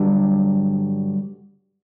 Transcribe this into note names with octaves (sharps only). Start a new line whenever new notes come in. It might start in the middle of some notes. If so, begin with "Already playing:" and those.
Already playing: G2 D3 F#3 G3